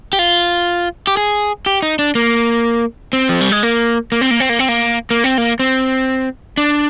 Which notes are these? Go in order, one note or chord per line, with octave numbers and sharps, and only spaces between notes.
G4
F4
G4
G#4
G4
D#4
D4
A#3
C4
F3
G3
G#3
A#3
A#3
C4
A#3
C4
A#3
C4
A#3
A#3
C4
A#3
C4
D4